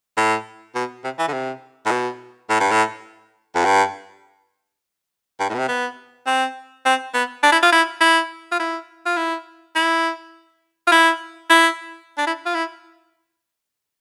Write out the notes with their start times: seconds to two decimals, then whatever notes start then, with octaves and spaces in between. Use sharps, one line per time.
0.17 A2
0.75 B2
1.04 C3
1.19 E3
1.28 D3
1.33 C3
1.86 A2
1.91 B2
2.49 A2
2.60 G2
2.71 A2
3.55 F2
3.65 G2
5.40 G2
5.49 A2
5.54 B2
5.59 C3
5.68 B3
6.26 C4
6.85 C4
7.14 B3
7.43 D4
7.52 E4
7.63 F4
7.72 E4
8.01 E4
8.52 F4
8.59 E4
9.06 F4
9.17 E4
9.75 E4
10.87 F4
10.92 E4
11.50 E4
12.18 D4
12.27 E4
12.46 F4
12.54 E4